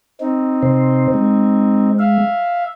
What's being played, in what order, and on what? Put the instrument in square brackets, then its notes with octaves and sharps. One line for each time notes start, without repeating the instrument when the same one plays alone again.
[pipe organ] C4 D#4
[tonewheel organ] C3 C5
G#3
[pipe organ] E5 F5